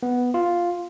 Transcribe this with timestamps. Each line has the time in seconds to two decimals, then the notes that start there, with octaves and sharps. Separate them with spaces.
0.03 B3
0.34 F4